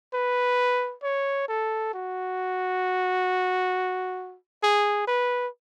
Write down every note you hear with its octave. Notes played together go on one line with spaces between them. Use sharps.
B4
C#5
A4
F#4
G#4
B4